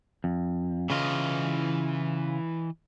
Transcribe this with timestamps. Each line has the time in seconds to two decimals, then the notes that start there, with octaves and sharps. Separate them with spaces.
0.24 F2
0.90 C#3 E3 F4 D#5